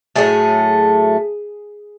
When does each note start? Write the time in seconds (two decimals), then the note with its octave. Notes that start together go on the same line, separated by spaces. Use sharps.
0.16 A2 F#3 A3 G#4